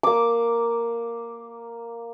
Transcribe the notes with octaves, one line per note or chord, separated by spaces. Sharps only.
A#3 D6